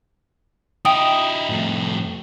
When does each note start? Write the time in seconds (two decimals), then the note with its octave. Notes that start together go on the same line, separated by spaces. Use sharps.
0.85 D#4 E4 G5 D#6
1.49 F2 A2